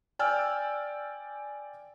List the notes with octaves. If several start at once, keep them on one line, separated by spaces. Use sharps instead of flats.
D5 G5 G#5 E6 F6